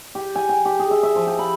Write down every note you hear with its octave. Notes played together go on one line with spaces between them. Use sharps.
G4
G#5
G5
G4
G#4
E5
E5
F3
G4
B5